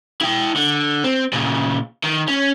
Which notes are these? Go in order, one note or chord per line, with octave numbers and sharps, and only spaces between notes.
E4 G5
D3
C4
A#2 C#3
D#3
C#4